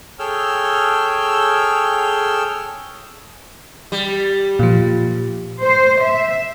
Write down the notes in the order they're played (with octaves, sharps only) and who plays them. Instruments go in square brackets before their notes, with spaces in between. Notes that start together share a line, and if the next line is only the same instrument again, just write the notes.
[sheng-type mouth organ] G#4 A4 C#5 G5 E6 F6
[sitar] G3
[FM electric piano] A#2 F3
[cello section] C5
E5